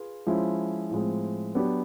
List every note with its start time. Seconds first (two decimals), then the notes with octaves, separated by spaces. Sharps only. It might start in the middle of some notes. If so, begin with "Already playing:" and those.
Already playing: F4 G#4 B4
0.26 F3 G#3 C#4 E4
0.91 A2 F3 G#3 C4
1.55 F#3 B3 D4 G4 B4